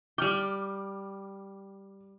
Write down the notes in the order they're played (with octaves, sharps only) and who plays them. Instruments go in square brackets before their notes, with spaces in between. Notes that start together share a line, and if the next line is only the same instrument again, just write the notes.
[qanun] G3 G5 [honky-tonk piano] D6 F6